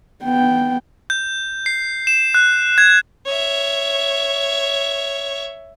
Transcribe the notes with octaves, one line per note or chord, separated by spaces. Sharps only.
B3 G5
G6
C7
E7
F#6
G#6
C#5 E5